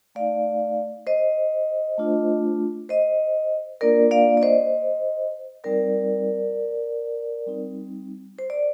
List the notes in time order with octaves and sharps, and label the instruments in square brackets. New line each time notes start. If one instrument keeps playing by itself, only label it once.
[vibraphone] A3 D#4 D5 F5
C5 D#5
A3 D4 F4
C5 D#5
A#3 D4 F4 A#4 D5
D5 F5
D5
C5 D#5
G3 C4 D#4 A#4 D5
G3 C4 D#4
C5
D5